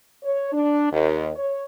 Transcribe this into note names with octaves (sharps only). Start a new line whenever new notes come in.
C#5
D4
D#2
C#5